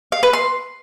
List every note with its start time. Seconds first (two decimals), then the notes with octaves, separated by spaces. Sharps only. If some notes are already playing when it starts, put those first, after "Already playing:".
0.12 F5
0.23 B4
0.33 C6